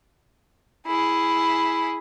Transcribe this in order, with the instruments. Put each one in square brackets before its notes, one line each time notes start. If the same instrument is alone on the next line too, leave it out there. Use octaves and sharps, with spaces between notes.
[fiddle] E4 G#4